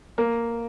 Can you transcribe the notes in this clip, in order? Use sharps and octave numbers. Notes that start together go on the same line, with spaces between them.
A#3